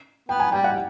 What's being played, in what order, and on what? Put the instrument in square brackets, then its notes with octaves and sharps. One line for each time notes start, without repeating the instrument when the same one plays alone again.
[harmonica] B3 [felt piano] G5
[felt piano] G#5
[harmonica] G3 [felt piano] G5
[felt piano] F#5